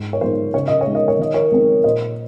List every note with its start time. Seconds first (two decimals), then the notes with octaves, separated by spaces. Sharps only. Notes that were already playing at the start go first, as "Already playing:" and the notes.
Already playing: G#2
0.13 C#5
0.21 F3 G#3 D#4 C5
0.54 C#3 C#5
0.68 D#5
0.81 C#5
0.87 G#3 D#4
0.95 D#5
1.08 C#5
1.19 D#3 D#5
1.34 A#4 C#5
1.51 G#3 C4 D#4
1.84 A#2 C5 D#5